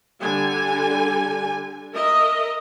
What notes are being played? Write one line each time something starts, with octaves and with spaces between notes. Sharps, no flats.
D3 G3 G#5
A#4 D#5 E5